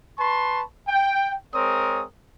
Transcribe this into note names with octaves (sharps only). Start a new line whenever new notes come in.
B4 A5 C6 C#6
G5
G#3 C4 A#4 C#5 D#6